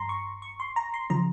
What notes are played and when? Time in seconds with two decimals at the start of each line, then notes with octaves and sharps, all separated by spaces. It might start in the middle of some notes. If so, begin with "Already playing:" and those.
Already playing: G2 A#5 C6
0.09 C#6
0.42 C#6
0.60 C6
0.76 A#5
0.94 C6
1.10 C#3 F3 A#5